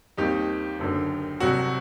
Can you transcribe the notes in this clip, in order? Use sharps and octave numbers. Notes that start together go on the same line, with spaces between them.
D#2 D#3 G3 C4 D#4 G4
F#1 F#2 D3
C2 C3 F#3 F#4